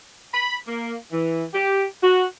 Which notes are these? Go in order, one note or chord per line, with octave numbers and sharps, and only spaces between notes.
B5
A#3
E3
G4
F#4